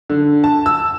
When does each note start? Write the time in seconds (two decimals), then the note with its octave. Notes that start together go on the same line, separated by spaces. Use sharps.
0.10 D3
0.44 A5
0.66 E6